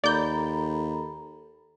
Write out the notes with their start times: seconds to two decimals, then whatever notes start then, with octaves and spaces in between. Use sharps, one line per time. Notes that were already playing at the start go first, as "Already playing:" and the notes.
0.04 D#2 A4 D5 A#5 B5 G6